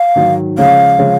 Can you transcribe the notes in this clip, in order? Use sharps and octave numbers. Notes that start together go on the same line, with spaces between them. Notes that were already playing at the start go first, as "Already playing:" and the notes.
Already playing: F5
G#2 D#3 F#3
C#3 F3 G#3 C#4 F5
C#3 F3 G#3 C#4